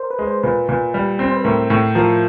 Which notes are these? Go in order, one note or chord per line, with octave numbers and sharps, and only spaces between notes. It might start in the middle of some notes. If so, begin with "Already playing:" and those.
Already playing: A#4 C5
B4
G#3
C5
A#2 B4
A#2 B4
G3
C4
C5
B4
A2 A#4
A2
F3 A#4